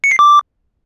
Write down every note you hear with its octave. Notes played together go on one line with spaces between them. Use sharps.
C#7
C7
D6